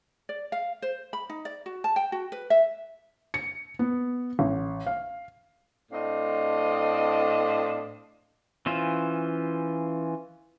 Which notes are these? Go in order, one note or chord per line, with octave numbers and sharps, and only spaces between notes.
D5
F5
C5
B5
D#4
D5
F#4
A5
G5
F#4
B4
E5
C#7
B3
A1
F5
A2 C4 D4 D#5 F5
E3 C#4 F4 C5